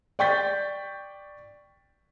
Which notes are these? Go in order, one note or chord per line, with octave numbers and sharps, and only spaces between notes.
D5 G5 C#6 G6 A6 B6